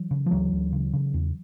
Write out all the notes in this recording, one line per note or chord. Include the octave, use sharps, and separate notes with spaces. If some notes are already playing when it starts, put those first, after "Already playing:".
Already playing: E3 F#3
C#3
F3
D2 E3 F#3
D2
C#3
C#3
E2